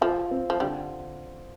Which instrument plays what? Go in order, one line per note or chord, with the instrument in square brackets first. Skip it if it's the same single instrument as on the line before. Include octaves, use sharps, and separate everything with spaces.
[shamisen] F3 [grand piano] F4
[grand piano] C4
[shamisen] F3
[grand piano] D3 [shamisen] G3